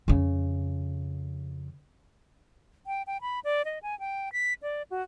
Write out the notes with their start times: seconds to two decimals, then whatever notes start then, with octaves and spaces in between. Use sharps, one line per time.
0.08 F2 C#3
2.87 G5
3.07 G5
3.21 B5
3.44 D5
3.65 D#5
3.83 G#5
4.00 G5
4.33 B6
4.63 D5
4.91 F#4